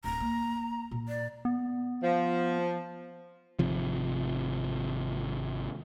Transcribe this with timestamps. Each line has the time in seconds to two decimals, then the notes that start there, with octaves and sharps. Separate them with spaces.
0.04 D1 A#5
0.20 A#3
0.91 A#2
1.08 D5
1.45 B3
2.02 F3
3.59 G#1 C3 F3